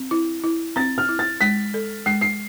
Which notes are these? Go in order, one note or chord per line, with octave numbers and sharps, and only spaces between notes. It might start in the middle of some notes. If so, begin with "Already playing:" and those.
Already playing: C4
E4
E4
C4 A6
F6
E4
A6
G#3 B6
A4
G#3 C7
C7